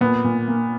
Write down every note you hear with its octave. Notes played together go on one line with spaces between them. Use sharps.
A#2 B3
A#2
A#3